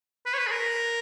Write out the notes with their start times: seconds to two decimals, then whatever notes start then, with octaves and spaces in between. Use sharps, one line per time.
0.26 B4
0.34 C#5
0.38 B4
0.47 G#4
0.51 A#4